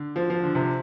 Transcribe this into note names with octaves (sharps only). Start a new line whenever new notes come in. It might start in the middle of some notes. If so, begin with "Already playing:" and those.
Already playing: D3
F3
F3
D3
C3